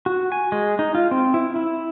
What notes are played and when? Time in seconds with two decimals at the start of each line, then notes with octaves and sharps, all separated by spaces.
0.06 F#4
0.32 G#5
0.52 G#3
0.79 D#4
0.95 F4
1.11 C4
1.34 E4
1.56 E4